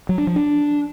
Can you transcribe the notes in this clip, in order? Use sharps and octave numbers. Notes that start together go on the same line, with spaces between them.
F#3
D4
F3
D4